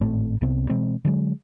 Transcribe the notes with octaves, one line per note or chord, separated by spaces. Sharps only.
G#1 A2 A3 C4
C2 C3 B3 C4
B2 E3 G#3 C4
D3 F#3 G#3